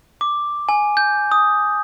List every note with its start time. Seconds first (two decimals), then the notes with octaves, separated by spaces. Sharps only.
0.21 D6
0.69 G#5
0.97 G6
1.32 D#6